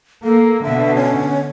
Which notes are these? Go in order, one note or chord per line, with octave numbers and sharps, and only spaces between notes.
A#3 A4
B2 D3 E5
C#4